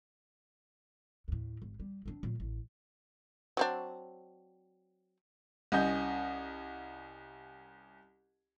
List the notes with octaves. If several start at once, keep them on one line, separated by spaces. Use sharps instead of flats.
D#2 A2
G#1
G3
C4 D4
A#2 F#3
A1
F#3 C4 D4
C2 C#4 D#5 G6